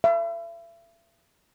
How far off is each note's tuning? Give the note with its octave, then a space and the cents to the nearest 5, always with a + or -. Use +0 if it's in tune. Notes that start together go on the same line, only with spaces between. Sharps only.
E5 +40